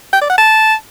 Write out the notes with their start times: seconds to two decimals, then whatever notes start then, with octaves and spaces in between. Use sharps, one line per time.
0.13 G5
0.21 D5
0.30 F#5
0.38 A5